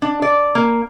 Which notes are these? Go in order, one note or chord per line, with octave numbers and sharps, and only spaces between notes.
D4
D5
A#3